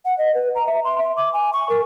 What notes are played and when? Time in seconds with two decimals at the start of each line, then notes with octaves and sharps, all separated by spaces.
0.05 F#5
0.18 D#5
0.34 B4
0.55 A#5
0.67 E5
0.84 C6
0.98 E5
1.17 D6
1.33 G#5
1.53 C#6
1.69 A#4